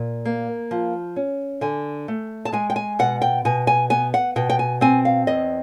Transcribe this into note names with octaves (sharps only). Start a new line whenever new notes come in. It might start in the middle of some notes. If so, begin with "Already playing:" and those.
Already playing: A#2
A#3
F3
C#4
D3 G#5
A3
A5
G#3 G#5
G5
G#5
B2 F#5
G5
B2 G#5
G#5
B3 G#5
F#5
B2 G5
G5
G#5
C4 G#5
F5
E2 D#5